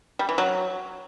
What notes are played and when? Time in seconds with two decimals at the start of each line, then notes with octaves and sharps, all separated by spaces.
0.19 G3
0.29 E3
0.38 F#3